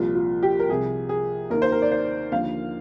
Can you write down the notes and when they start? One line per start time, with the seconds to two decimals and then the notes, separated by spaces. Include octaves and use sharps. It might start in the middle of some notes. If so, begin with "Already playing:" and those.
Already playing: C2 A#2 F3 F4
0.15 F4
0.43 G4
0.59 A#4
0.69 C2 C3 F3 G#4
1.09 G#4
1.50 D#2 D#3 A#4
1.62 C5
1.72 A#4
1.82 D5
1.91 C5
2.32 D#2 D3 F3 F5